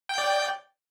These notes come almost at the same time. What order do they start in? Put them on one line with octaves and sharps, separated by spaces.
G5 G6 D5